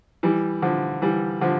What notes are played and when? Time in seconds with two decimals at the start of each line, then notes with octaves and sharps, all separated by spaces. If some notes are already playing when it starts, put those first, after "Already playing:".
0.23 E3 G3
0.62 D3 F3
1.02 E3 G3
1.41 D3 F3